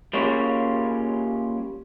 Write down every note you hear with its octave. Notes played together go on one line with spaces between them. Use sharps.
G3 A#3 C#4 F4 G#4 C#5